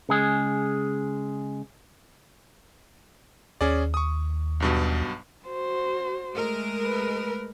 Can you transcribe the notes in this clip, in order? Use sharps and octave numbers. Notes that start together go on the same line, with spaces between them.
C#3 G#3 G#4
D#2 C#4 G#4 D5
C#6 D#6
B1 G2 B2
F#4 C5
G#3 A3 A#4
B4